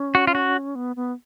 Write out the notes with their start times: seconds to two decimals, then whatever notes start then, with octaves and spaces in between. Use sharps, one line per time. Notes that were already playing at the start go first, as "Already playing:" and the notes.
Already playing: C#4
0.15 F#4
0.27 F4
0.35 F#4
0.75 B3
0.96 B3